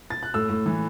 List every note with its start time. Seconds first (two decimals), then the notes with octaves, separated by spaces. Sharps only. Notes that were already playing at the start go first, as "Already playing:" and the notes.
0.10 A6
0.23 F#6
0.34 A2 E6
0.49 A2
0.66 E3